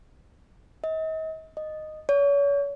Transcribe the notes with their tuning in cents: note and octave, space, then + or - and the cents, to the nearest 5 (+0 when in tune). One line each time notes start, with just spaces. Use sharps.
D#5 +40
D#5 -10
C#5 +35